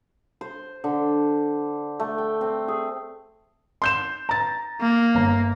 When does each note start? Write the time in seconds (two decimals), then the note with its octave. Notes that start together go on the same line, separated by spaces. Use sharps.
0.41 C5
0.84 D3
2.00 A3
2.18 G5
2.41 C4
2.68 G#4
3.82 C6 G6 E7
4.29 A#5 A6
4.81 A#3
5.15 G1 A#5